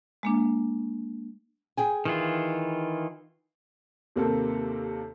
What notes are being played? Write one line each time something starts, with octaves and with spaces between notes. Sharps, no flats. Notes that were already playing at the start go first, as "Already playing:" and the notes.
G#3 A#3 D4
G#4 G5 G#5
D#3 E3 F4
D#2 C3 A#3 C4 A4